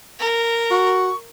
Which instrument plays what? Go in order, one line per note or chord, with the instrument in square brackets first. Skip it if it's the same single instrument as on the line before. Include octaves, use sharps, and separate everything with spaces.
[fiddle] A#4
[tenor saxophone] F#4 [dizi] C#6